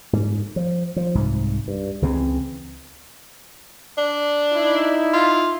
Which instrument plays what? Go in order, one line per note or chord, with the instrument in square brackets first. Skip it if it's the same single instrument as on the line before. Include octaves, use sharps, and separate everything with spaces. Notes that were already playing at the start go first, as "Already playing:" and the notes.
[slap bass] G#2
F3
F3
C2 G#2
G2
C#2 C#3 E3 C4
[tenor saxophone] D4
[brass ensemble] D#4 E4
[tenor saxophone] F4